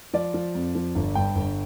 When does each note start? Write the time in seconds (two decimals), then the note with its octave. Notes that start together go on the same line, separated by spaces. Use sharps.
0.13 F3 D5
0.34 F3
0.55 F2
0.75 F3
0.95 G1
1.15 G2 G5
1.35 G1